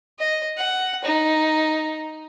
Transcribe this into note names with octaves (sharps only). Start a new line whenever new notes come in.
D#5
F#5
D#4